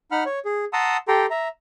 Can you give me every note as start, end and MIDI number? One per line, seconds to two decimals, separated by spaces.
0.12 0.24 63
0.12 0.24 78
0.12 0.24 83
0.12 0.24 89
0.26 0.39 73
0.45 0.65 68
0.73 0.97 78
0.73 0.97 81
0.73 0.97 82
0.73 0.97 84
0.73 0.97 87
0.73 0.97 88
1.08 1.26 67
1.08 1.26 69
1.08 1.26 79
1.08 1.26 82
1.08 1.26 84
1.30 1.48 76
1.30 1.48 82